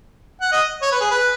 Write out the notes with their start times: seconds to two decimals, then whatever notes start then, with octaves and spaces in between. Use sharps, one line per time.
0.42 F#5
0.52 D#5
0.82 C#5
0.92 B4
1.01 G#4
1.11 B4